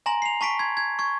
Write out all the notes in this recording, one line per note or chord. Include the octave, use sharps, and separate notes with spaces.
G#5 A#5 C6 A#6 F#7
C7 F7
A5 C#6 B6 D7
C6 G#6
G#6
C#6 G#6